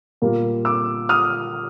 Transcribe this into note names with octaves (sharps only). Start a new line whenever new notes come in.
A#2 G3 A#3
D6 E6
D#6 F6